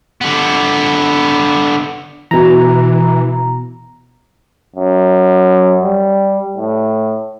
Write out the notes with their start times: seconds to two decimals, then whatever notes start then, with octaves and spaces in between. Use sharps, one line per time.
0.21 D3 B3
2.31 B2 E3 A#5
4.76 F#2
5.83 G3
6.57 A2